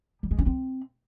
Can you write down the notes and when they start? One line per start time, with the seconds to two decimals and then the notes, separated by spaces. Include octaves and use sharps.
0.23 G3
0.31 G#3
0.39 C#4
0.46 C4